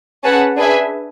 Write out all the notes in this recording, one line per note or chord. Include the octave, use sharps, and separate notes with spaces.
C#4 G#4 B4 F#5 A5
D4 G#4 B4 E5 G#5